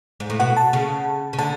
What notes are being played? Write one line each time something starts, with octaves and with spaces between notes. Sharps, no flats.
G#2
A2
B2 F#5
A5
C#3
C#3
D3 A5